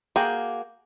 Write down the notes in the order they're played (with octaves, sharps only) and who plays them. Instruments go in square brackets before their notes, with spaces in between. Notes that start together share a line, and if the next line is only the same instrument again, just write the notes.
[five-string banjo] A#3 F#4 G#4 G5